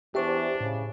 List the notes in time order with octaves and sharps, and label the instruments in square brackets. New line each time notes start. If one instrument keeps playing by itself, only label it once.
[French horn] E2 [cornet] D4 [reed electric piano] G4 C5 [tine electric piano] E5 A5 C#6
[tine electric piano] A2 [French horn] C#3